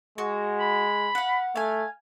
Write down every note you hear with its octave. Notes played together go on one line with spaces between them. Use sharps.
G#3 F#4
B5
F5 F#5
A3 F5 G#5